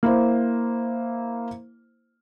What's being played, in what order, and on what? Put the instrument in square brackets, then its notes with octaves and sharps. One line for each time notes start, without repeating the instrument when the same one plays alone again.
[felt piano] A#3 E4 C5